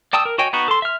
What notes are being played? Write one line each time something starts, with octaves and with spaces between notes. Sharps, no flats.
D5 G5 A5 D#6 E6
A#4
F#4 C#5 D#5 G5 G#5
B3 D#4 F#4
A4 C6
E5 F6